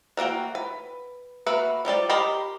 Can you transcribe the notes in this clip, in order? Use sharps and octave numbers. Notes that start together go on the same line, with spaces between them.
E3 A#3 F#4 G5
B4
A#3 F#4 B4 E5
F3 G3 G4 D5
G4 A#4 C5 D#5 B5